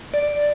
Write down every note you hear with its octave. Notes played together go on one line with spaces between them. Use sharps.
D5